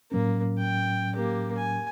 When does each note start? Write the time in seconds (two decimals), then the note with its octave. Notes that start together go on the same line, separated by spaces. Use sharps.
0.12 A2 F#3 A#3 C#4
0.59 G5
1.16 A#3 G4
1.57 G#5